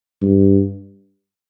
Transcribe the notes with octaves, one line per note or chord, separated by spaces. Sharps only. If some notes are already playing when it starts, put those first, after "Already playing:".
G2